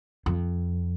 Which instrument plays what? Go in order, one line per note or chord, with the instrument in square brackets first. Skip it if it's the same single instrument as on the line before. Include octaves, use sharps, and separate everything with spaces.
[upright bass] F2